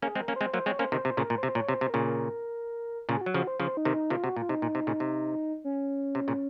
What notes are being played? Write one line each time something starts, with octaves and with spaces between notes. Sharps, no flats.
A#3 C#4 G#4
G#3 C4
A#4
A#3 C#4
G#3 C4 C5
F#3 A#3 C5
G#3 C4 C#5
A#3 C#4 C5
C3 D#3 C5
C3 C5
A#2 C#3
A#4
A#2
C3 C5
A#2 C#5
C3
C5
C3
A#2 C#3 A#4
A#4
A#2 C#3 G#4
F#4
F#3
C#3 F3 F#4
C5
C#3 F3 C5
D#4
C3 D#3
D#4
C3 D#3 F4
C3 F#4
A#2 F4
C3 D#4
A#2
C3
A#2 C#3
C3
C#4
C3
A#2 C#3